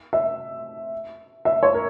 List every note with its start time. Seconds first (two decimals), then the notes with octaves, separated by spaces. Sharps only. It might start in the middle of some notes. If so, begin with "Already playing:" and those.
0.13 E5
1.45 E5
1.63 C#5
1.74 A#4